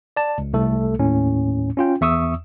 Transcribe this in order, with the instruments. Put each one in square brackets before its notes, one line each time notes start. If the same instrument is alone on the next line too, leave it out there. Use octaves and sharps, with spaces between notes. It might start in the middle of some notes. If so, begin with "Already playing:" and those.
[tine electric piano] D5 A5
C#2
C2 A3 A4
D#2 A2 C#4
C#4 F4 G5
E2 E5 C#6 D#6 E6